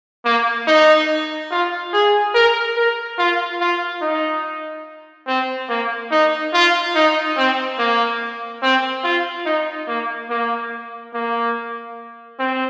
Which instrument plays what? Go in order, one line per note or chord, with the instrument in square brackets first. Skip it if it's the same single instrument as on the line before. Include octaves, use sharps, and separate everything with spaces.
[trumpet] A#3
D#4
F4
G#4
A#4
A#4
F4
F4
D#4
C4
A#3
D#4
F4
D#4
C4
A#3
C4
F4
D#4
A#3
A#3
A#3
C4